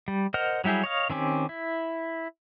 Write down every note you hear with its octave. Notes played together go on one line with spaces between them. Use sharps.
G3
A#4 C5 D#5 F#5 F6
F#3 G3 E4 G4 G#4
C#5 D#5 F5
D#3 C4 C#4 G4
E4